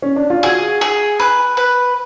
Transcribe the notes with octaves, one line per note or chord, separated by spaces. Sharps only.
C#4
D4
F4
F#4 G#4
G#4
B4
B4